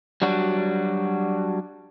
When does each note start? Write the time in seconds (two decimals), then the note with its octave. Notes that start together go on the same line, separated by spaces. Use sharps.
0.22 F#3 G3 D4 F#4